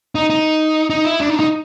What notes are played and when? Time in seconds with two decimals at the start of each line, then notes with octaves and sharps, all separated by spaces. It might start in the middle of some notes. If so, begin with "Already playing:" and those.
0.15 D#4
0.30 D#4
0.90 D#4
1.05 E4
1.20 D4
1.30 D#4
1.36 D4
1.40 D#4